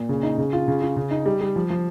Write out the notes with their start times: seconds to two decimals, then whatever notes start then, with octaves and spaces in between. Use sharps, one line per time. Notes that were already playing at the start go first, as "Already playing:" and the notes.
Already playing: A#2
0.09 C#3
0.23 D#4
0.38 C#3
0.53 F4
0.68 C#3
0.82 F4
0.96 C#3
1.11 D#4
1.26 G3
1.41 G3
1.56 F3
1.70 F3